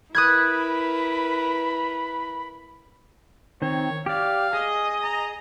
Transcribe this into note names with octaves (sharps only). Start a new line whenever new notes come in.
E4 A#4 B4 B5 D#6 F#6 G#6
D#3 C4 C#5
G4 D5 F5
G#4 D#5
A#5